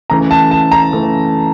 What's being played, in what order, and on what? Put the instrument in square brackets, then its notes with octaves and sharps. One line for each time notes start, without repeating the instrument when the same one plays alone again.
[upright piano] C#3 E3 A3 [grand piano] A#5
[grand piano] A5
A5
A#5
[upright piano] C#3 E3 A3